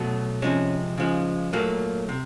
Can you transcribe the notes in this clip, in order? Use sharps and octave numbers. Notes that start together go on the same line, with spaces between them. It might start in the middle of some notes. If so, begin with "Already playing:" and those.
Already playing: B2 F#3 A3
C3 F3 G#3 C#4
C#3 F3 G#3
A#2 F#3 A3 A#3
C3